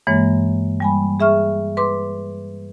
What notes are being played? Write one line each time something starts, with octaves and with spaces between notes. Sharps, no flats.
G2 E3 G#3 A#3 C#5
G3 G#5 B5
G#4 E5 C#6 F6
B4 C6 D6